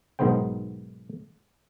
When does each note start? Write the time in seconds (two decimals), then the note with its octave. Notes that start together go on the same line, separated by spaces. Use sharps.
0.19 B1 G#2 D#3 B3 C5 G5